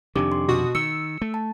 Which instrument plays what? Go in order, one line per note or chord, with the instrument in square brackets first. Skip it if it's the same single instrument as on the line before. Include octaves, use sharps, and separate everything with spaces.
[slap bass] F2 C3 D#3 [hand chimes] D4 G4 D6
[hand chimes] C6
[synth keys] B2 F#4 D#6
[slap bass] D#3 [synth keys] E6 [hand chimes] C#7
[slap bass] A3
[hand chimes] A5